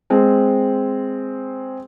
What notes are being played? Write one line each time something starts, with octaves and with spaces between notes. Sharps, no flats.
G#3 C4